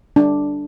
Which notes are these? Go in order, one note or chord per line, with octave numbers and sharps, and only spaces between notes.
D4